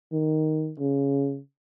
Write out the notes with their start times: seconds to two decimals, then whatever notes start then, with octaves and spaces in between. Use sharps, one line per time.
0.12 D#3
0.79 C#3